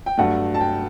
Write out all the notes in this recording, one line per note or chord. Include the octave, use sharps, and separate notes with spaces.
G5
G2 F#3 A3 F#5
A5
G5